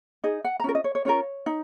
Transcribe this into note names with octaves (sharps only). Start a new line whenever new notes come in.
D#4 G#4 D#5
F#5
A#5
C#4 F4 A#4
D#5
C#5
C#5
C#4 F4 A#4 C#5
D#4